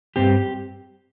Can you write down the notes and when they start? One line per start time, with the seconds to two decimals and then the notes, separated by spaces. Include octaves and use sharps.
0.16 G2 G3 C4 G4